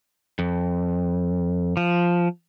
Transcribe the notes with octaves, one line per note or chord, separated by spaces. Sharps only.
F2
F3